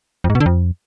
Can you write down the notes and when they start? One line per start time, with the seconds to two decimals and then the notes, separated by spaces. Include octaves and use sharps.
0.24 F2
0.30 G#2
0.35 B2
0.40 D3
0.46 F2